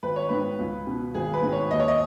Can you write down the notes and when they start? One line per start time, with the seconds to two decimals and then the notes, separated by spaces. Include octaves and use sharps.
0.03 G#1 B4
0.16 C#5
0.29 G#2 D#3 B4
0.59 C#2
0.87 B2
1.14 G#1 G#4
1.33 B4
1.42 G#2 D#3
1.52 C#5
1.71 D#2 D#5
1.79 C#5
1.88 D#5